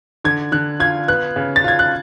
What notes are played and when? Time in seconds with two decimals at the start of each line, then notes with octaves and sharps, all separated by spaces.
0.24 D3 G#6
0.52 D3 F#6
0.80 F4 G#6
1.08 B3 F#6
1.36 C#3
1.56 A6
1.64 F4 G#6
1.79 F#6